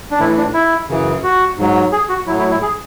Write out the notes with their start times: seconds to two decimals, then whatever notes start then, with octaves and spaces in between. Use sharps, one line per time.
0.11 D4
0.19 A2 E3 E4
0.37 D4
0.53 E4
0.89 F#2 C#3 E3
1.24 F#4
1.58 G#2 F#3
1.92 G#4
2.09 F#4
2.27 F#3 E4
2.30 A2
2.39 E4
2.51 E4
2.62 G#4